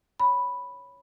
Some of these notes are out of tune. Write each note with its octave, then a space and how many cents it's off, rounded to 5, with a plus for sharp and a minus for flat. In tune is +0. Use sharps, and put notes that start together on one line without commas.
C#5 +0 B5 +0